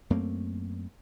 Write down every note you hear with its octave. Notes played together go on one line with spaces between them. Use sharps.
F#2 A3 A#3 C4